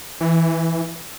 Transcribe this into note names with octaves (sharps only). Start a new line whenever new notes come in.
E3